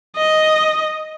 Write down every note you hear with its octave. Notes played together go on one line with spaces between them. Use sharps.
D#5